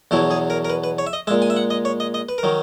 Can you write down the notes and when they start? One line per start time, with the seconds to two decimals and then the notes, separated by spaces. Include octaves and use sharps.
0.11 E2 B2 F#3 E4
0.31 G#4
0.50 A#4
0.65 A#4
0.70 B4
0.84 B4
0.98 C#5
1.07 E5
1.13 D#5
1.27 G#3 E5
1.31 A#2
1.42 G#5
1.50 E5
1.57 F#5
1.70 D#5
1.85 C#5
2.00 D#5
2.14 D#5
2.29 B4
2.38 A#4
2.43 D#3 F#3